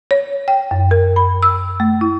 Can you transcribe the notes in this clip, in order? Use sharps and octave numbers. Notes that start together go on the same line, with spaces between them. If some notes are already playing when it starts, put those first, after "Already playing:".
C#5
G5
F#2
A#4
B5
E6
A3
E4